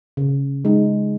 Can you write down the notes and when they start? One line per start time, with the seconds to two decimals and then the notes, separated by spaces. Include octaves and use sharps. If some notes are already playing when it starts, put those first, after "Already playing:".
0.17 C#3
0.65 G#3 D#4